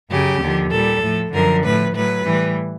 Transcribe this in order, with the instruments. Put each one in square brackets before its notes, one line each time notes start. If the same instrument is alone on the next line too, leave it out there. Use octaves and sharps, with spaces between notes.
[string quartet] F#2 C#3 F#3 G4
D#2 D3 F3
A#2 G3 A4
A2 F3
F#2 D3 F3 A#4
A2 F3 B4
A2 F#3 B4
A2 E3 G3